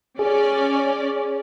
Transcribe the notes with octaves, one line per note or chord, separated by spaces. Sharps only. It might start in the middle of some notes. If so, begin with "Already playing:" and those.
C#4 G#4 D5